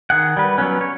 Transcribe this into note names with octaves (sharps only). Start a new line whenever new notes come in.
D#3 G#4 F#5
G3 B4
F#3 B3 C#4
C#5